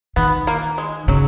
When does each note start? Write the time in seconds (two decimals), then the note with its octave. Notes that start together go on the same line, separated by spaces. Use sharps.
0.16 D#3 B3
0.47 A#3
0.78 G#3
1.08 C#3 F#3